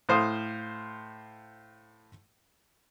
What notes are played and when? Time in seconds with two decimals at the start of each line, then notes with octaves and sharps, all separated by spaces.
0.09 A2 C5 F5 D#6